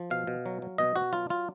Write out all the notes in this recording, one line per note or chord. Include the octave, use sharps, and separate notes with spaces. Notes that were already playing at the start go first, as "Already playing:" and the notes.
Already playing: F3
B2 F5
B2
F#3
F#3
B2 D#5
B2 F#4
F#3 F4
F#3 F4